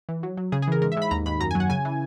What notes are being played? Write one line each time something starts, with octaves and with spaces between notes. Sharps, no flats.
E3
F#3
F#3
C#3 G#4
G#4
E3 A#4
G#2 A#4
E5
G#2
B5
D#2 A#5
D#2 B5
F#2 A#5
G#5
F#3
F#5
C#3 G#5
E3